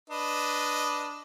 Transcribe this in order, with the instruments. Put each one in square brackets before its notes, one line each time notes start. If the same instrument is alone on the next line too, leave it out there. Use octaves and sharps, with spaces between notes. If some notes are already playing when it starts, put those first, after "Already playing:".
[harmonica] D4 B4 D#5